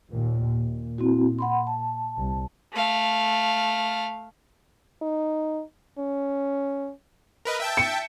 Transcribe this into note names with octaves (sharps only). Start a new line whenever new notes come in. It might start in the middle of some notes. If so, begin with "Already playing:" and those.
D#2 A#2
A#2
C4 E4 F#4
F#5 B5 C6
A5
C2
A3 F5
D#4
C#4
A#4 B4 D#5
E5 G5 A5
C#7